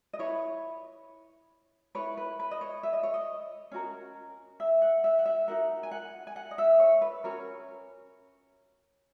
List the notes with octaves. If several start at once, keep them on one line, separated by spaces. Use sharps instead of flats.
D#5
E4 B4 C#5
E4 B4 C#5
B4
B4
D#5
C#5
E5
D#5
C#5
D#5
C#4 F#4 A#4
E5
F#5
E5
F#5
E5
D#4 F#4 A#4 F#5
G#5
F#5
G#5
F#5
D#5
E5
C#5
B4
C#4 F#4 A#4 C#5